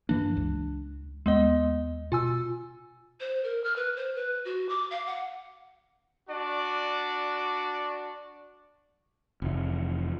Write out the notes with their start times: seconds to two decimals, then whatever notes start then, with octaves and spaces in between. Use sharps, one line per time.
0.09 G2 E3 A#3 D4
0.37 C#2
1.26 D#2 G#3 B3 D#5
2.12 B2 F4 G#5 E6
3.20 C5
3.44 A#4
3.64 F6
3.76 B4
3.96 C5
4.16 B4
4.45 F#4
4.69 D6
4.91 F5
5.07 F#5
6.29 D4 F#4 D5
9.42 F1 E3